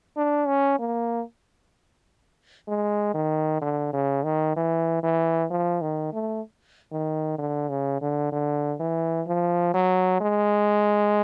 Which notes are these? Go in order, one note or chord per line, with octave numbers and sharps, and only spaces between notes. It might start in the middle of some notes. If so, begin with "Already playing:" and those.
D4
C#4
A#3
G#3
D#3
D3
C#3
D#3
E3
E3
F3
D#3
A3
D#3
D3
C#3
D3
D3
E3
F3
F#3
G#3